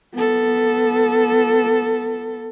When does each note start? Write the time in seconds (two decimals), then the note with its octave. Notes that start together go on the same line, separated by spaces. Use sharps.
0.14 B3 A4